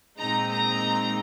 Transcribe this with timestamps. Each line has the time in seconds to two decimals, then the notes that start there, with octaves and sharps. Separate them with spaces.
0.18 A#2 G#3 C4 D#4 A#5
0.50 A#5